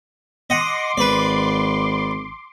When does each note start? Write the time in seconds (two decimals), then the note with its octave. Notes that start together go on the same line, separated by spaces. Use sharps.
0.50 D#5 F#5 C6 D6
0.97 G#1 B4 D5